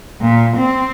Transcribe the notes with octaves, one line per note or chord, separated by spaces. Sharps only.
A#2
C4